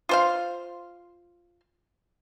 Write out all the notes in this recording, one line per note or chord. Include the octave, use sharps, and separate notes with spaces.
F4 C5 F5